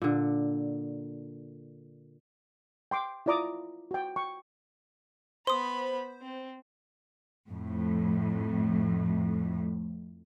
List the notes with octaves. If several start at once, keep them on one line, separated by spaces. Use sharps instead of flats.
A#2 D3
G5 C6 D6
E4 F4 D5 A#5 D6 D#6
F#4 G5
G5 C#6
B3 C5 B5 C6 D#6
C4
F2 A2